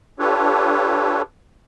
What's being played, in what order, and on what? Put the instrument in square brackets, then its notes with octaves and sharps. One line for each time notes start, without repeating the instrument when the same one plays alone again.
[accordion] D4 F4 G4 A4 B4 C#5